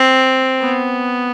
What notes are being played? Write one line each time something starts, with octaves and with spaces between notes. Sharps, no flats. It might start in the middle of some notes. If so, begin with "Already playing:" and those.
Already playing: C4
B3